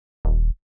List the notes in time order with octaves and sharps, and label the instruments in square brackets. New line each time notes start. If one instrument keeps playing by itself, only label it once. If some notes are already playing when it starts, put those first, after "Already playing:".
[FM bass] D#1